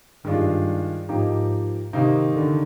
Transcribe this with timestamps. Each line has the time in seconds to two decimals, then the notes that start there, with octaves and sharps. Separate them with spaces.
0.25 G2 D#3 G#3 D4 F4
1.08 G#2 F3 A#3 D#4 G4
1.93 C3 D#3 A#3 D#4
2.34 D3